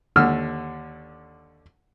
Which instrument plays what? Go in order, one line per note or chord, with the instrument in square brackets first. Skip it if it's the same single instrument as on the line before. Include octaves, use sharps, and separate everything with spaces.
[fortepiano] D#2 D3 E6 F6